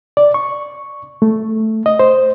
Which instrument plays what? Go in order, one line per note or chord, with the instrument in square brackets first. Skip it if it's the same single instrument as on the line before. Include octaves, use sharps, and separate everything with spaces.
[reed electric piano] D5
C#6
A3
D#5
C5